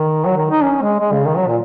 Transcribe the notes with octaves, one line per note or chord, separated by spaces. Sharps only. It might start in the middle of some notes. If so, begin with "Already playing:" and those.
Already playing: D#3
F#3
D#3
D#4
C#4
G#3
G#3
C#3
D#3
F#3
A#2